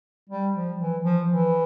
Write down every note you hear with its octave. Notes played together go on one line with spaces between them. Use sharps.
G3
F3
E3
F3
E3